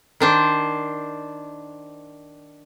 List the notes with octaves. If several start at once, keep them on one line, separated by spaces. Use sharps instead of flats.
D#3 D4 C5